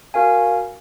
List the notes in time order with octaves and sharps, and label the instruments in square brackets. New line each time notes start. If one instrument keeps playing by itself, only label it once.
[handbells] F#4 A#4 F5 G#5